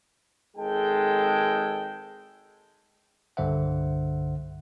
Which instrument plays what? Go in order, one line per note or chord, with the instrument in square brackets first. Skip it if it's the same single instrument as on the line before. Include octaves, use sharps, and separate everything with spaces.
[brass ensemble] G#1 G#3 A4 G5
[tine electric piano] C2 G2 D3 C5 E5 F#5